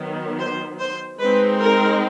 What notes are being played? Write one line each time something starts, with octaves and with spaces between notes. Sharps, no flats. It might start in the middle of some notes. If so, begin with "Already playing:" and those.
Already playing: D#3 F#3 B3
C5
C5
G#3 C4 D#4 B4
A#4